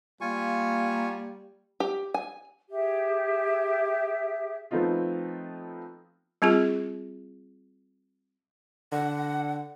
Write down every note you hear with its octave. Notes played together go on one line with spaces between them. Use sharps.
G3 A#3 F4 G#5 C#6
G4
G#5
G4 G#4 E5
F3 A3 B3 C4 D#4 F4
G3 C4 F4 G#4
D3 F#5